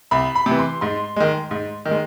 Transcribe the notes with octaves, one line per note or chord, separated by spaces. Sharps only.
C2 B5
B5
C3 E3
C6
G#2 C6
D#3 G#3
G#2
D#3
G#3